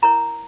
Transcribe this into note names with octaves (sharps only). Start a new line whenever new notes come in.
E4 A#4 C#5 A#5